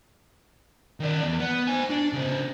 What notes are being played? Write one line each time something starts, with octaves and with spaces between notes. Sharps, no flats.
D#3 D5
E2
B3
C5 G#5
D4
C#3 C5